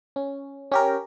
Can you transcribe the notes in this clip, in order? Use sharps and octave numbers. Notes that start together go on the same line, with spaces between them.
C#4
C#4 G4 A#4